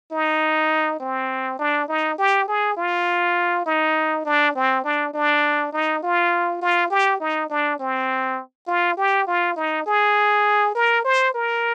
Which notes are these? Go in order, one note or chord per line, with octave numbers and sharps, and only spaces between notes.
D#4
C4
D4
D#4
G4
G#4
F4
D#4
D4
C4
D4
D4
D#4
F4
F4
G4
D#4
D4
C4
F4
G4
F4
D#4
G#4
A#4
C5
A#4